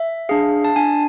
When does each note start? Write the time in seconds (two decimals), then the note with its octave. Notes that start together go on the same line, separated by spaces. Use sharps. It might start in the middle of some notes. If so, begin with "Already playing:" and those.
Already playing: E5
0.29 D4 G#4 F5
0.65 A5
0.76 D4 G#5